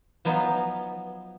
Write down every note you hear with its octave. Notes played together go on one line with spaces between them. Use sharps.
F3 F#3 B3 D#4 F4